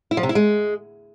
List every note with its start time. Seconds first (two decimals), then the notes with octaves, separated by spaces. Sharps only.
0.11 E4
0.17 F3
0.23 C3
0.29 E4
0.35 G#3